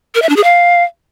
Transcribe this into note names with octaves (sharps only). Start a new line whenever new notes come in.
A#4
E5
D4
G#4
F5